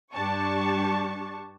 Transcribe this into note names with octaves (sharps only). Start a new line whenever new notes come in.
G2 D4 G4 A5 C#6